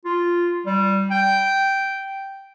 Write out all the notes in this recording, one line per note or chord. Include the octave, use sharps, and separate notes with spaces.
F4
G3
G5